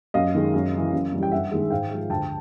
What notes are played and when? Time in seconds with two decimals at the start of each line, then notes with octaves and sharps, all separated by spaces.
0.14 F#2 D#5 F5
0.35 D#3 G#3
0.54 F#2
0.73 C#3 E3
0.93 F#2
1.12 C#3 E3 G3
1.23 G5
1.32 G2 E5 F#5
1.51 D#3 G#3
1.70 G#2 F5 G5
1.90 F3 G#3
2.10 D2 G5 A5